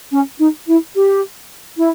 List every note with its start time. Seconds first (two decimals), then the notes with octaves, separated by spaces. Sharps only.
0.11 C#4
0.39 D#4
0.67 E4
0.95 G4
1.77 E4